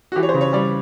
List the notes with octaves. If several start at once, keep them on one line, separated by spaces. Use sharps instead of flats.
F#4
E3 G4
C#5
C5
C#3
C#5
G3 D5